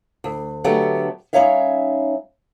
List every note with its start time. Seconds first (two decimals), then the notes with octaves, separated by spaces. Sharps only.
0.24 D2
0.64 D3 F#3 A3 B3 G4
1.33 G3 C#4 D#4 C#5 E5 F5